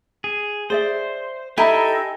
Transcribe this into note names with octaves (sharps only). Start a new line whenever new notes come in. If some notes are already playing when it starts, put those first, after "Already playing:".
G#4
G#4 C5 D5 E5
D#4 E4 G4 A4 D#5 G5 G#5 A#5